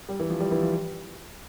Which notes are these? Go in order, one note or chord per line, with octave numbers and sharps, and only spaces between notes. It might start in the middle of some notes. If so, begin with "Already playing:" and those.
G3
E3
F3
G3
E3
F3